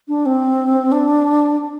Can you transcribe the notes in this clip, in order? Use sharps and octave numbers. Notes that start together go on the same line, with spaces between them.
D4
C4
D4